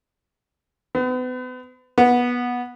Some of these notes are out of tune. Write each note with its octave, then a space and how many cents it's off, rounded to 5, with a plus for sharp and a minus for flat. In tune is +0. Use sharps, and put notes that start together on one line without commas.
B3 +35
B3 -15